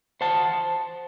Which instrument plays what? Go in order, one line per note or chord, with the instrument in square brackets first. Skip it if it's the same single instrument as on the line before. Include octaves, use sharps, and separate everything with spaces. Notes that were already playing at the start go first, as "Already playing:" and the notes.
[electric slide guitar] C5 F#5 A5